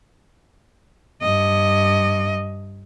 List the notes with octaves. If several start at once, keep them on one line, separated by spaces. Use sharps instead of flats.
G2 D#5